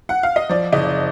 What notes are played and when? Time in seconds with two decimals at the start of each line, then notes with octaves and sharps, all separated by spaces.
0.09 F#5
0.23 F5
0.36 D#5
0.49 F3 D5
0.73 F#1 D#5